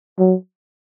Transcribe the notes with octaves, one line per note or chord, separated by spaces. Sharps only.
F#3